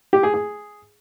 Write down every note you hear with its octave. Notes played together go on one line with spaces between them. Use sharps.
G4
G#4
G#4